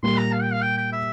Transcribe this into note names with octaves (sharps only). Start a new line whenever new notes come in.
A#2 G3 A#3 C6
A#5
F5
G5
F5
G5
G5
E5